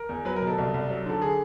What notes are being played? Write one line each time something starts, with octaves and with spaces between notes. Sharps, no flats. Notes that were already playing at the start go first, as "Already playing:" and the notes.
Already playing: A#4
E2
F#3 B4
A#4
B2
A4
C2
C2
F#3
D3 A4
G#4